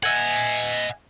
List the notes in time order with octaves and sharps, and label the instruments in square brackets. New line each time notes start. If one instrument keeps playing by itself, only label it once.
[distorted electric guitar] D#5 F#5 [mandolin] E5 G#5